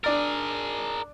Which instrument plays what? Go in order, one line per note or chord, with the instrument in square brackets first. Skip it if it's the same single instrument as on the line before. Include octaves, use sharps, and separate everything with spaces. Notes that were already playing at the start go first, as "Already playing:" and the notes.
[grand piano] D4 D5 A6 [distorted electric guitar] G#4 A#4